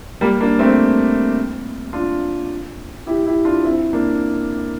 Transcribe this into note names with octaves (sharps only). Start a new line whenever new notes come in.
G3 A#3
A#3 D4
A3 C4
D4 F4
E4 G4
E4 G4
D4 F4
C4 E4
A#3 D4